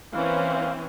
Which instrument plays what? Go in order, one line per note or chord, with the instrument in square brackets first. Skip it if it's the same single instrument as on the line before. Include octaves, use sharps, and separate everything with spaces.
[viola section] E3 C4 C#4 [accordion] A#3 F5